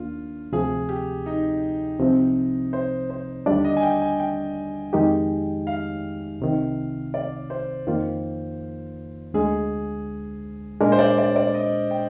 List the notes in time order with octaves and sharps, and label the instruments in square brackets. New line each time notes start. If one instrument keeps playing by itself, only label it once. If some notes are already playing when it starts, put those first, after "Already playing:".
Already playing: [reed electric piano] D#2 D#3 A#3 D4 [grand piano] F4
[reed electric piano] D2 C3 F3 [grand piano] G#4
[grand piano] G4
D#4
[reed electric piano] C2 C3 F3 C4
[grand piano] C5
C5
[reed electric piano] D#2 D3 G3 D4 [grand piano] D5
[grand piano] D#5
G#5
G5
G#5
G5
[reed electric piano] F2 D#3 G#3 D#4 G4
[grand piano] F5
[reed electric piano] C2 C3 D#3
[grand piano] D5
C5
[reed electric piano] F2 D#3 A#3 F4
[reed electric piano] D2 D3 G#3 [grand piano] G#4
[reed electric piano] A#2 G#3 D4 [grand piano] A#4
[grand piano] C5
D5
D5
D5
D#5
G5